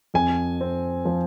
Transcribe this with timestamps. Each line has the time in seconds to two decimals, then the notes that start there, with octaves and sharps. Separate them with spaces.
0.14 F2 G#5
0.61 C4
1.05 F3